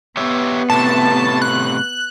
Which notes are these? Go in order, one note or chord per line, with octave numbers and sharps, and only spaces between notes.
B3 G4 C#5 E5
A2 C3 A5
F#6